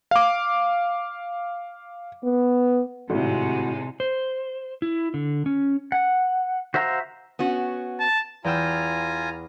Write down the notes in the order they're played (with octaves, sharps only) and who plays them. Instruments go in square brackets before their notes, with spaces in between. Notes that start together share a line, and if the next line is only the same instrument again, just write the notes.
[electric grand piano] F5 D6
[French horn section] B3
[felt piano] G#1 A2 [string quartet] C3 G#3 [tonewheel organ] F#4
[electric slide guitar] C5
E4
D3
C#4
[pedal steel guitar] F#5
F#4 C5 E5 F5 A#5
[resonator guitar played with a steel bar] B3 C#4 F#4
[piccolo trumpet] A5
[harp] E2 G5 E6 [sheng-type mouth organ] F4 G#5 A#5